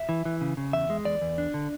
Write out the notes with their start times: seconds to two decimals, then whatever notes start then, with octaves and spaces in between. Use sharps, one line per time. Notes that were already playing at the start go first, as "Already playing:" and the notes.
Already playing: E5
0.09 E3
0.25 E3
0.41 C#3
0.57 C#3
0.73 E2 E5
0.90 G#3
1.05 E2 D5
1.22 E2
1.38 D4
1.54 D3